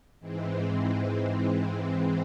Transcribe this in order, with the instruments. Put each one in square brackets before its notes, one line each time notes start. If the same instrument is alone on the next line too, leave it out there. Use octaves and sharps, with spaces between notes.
[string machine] G#2 E3 G#3 C4